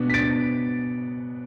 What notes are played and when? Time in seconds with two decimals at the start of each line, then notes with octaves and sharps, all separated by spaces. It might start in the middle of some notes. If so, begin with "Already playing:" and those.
Already playing: B2 B3 D4
0.10 B6
0.14 A6 D7